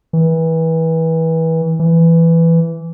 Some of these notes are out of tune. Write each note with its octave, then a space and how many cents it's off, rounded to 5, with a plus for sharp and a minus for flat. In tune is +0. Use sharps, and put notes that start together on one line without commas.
E3 -25
E3 +10